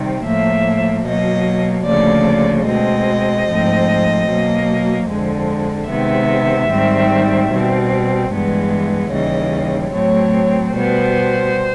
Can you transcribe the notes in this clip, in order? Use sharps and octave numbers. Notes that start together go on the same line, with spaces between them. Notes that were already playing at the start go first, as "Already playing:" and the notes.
Already playing: C3 D#3 G3
A2 F3 A#3 E5
B2 F#3 A#3 D#5
D2 C#3 F3 A#3 D5
B2 G#3 C4 D#5
G#2 F3 A3 C4
B2 F#3 A#3
F2 D3 F3 G#3
C3 D#3 G#3 B3 E5
G#2 D#3 G3 C4
B2 G3 C4
G2 E3 G#3 B3
D#2 C#3 E3 G3 D#5
A2 F#3 A3 C4 C#5
B2 G3 B3 C5